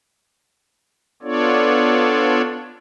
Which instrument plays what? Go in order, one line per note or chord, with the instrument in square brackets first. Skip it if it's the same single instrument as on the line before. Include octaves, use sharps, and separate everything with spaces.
[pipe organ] B3 D4 F4 A4 C#5 D5